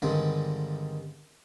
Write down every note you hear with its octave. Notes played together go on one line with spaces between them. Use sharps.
G2 D3 D#3 G#3 C4 B5